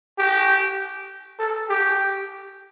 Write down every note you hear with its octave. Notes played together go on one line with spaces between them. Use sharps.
G4
A4
G4